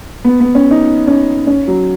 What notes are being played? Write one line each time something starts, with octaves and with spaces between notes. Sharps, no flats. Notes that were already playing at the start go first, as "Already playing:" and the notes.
B3
B3
C#4
D#4
C#4
C#4
F#3